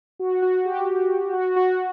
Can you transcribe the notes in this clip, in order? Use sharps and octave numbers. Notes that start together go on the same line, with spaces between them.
F#4
F#4
G4
F#4
F#4